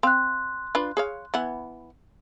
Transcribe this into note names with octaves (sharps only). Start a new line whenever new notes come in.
C4 F5 C6 F#6
D4 F4 B4
G#4 C#5 F5
E3 B3 F#5